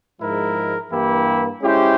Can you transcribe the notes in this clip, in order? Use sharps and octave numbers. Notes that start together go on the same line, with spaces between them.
G#2 F3 G#3 E4 A#4
G2 E3 A#3 E4 G4
G#3 C#4 E4 G4 C5